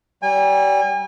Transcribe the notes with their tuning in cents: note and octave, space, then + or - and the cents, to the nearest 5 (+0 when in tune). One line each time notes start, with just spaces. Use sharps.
G3 -30 G#5 -40